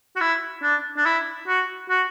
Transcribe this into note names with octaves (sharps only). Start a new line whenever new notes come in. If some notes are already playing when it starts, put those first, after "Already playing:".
F#4
E4
D4
D4
E4
F#4
F#4